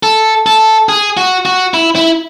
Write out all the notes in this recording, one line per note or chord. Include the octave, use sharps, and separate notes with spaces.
A4
A4
G#4
F#4
F#4
E4
E4